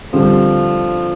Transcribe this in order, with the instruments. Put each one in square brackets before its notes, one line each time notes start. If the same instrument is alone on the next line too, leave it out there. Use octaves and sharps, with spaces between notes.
[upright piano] D3 G3 C4 G4 [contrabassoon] F3